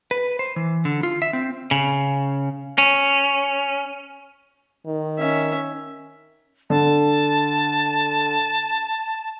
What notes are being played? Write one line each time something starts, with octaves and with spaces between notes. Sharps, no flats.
B4
C5
E3
D3
F4
E5
C4
C#3
C#4
D#3
C#4 E5
D3 A5